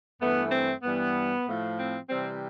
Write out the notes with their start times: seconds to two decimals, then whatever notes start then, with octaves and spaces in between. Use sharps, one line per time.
0.21 G2 E3 A3 B3
0.52 C4
0.83 G2 E3 G3 B3
1.46 A2 F3 A3
1.78 C4
2.09 C3 E3 G3 C4